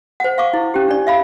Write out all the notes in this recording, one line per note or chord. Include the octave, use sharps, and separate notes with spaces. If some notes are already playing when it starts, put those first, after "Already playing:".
C5 F#5
F5 C#6 D6
E4
C#4 G4
D4 D5
E5 F5 B5